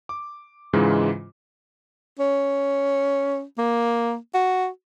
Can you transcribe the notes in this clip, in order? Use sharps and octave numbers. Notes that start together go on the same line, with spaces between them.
D6
G#2 C#3 E3 G#3 F4
C#4
A#3
F#4